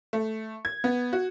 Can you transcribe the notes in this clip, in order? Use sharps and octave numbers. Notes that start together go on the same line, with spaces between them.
A3
G#6
B3
F#4